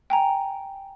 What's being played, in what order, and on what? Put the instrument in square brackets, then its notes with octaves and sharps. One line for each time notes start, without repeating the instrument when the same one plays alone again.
[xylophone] G5 G#5 A#5